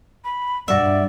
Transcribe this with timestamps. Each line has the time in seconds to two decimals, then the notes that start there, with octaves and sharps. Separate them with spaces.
0.24 B5
0.68 G2 F#4 D5 E5